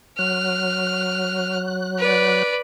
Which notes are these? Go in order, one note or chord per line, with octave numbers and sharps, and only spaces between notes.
F#3 F6 F#6
B4 D5